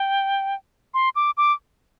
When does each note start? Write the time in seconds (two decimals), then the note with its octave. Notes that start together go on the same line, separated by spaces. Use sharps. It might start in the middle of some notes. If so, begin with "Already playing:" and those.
Already playing: G5
0.94 C6
1.16 D6
1.37 D6